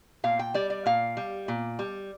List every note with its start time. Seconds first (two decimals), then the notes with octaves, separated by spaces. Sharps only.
0.24 A#2 F5
0.39 G5
0.54 G3 D5
0.70 D5
0.86 A#2 F5
1.17 G3
1.48 A#2
1.79 G3